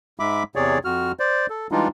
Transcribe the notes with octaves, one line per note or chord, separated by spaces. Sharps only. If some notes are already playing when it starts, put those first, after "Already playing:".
G#2 G#3 E5 B5 D6
E2 C3 G#4 C#5 D5
F2 F#4 F6
C5 D5
A4
E3 G3 G#3 D4 D#4 F4